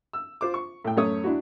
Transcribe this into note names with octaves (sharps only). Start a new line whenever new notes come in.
E6
F4 C5 D6
C#6
A2 G5
F#2 A3 C#5 D#6
D4 E4 F#4